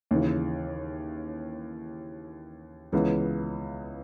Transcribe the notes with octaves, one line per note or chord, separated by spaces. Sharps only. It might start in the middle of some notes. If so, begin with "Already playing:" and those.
D#2 C#3 E3
C#2 C#3 E3 B3